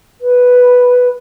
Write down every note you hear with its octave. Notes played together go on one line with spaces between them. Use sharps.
B4